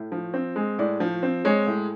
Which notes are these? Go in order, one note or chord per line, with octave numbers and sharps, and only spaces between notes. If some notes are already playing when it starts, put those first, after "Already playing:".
Already playing: A2
F3
C4
G#3
A2 D5
F3
C4
G#3 C#5
A2